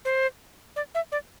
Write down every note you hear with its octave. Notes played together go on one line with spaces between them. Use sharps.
C5
D5
E5
D5